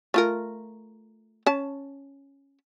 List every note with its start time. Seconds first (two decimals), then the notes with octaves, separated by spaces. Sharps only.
0.14 A3 F4 A#4
1.46 C#4 A5